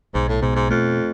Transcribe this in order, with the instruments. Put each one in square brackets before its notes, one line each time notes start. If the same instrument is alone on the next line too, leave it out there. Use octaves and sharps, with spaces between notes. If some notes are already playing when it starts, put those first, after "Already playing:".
[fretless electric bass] B1 [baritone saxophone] G#2
[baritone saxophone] A2
[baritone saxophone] G#2 [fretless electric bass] B2
[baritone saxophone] G#2
[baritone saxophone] F2 [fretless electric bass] A3